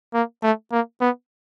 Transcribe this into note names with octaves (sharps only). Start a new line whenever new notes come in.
A#3
A3
A#3
B3